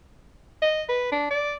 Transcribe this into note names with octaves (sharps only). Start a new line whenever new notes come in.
D#5
B4
D4
D5